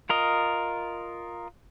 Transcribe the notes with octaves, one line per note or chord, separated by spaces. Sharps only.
F4 A#4 D#5